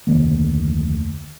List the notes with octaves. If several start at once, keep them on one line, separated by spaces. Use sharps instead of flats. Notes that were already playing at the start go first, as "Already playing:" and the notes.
F1 D2 D#3 A#3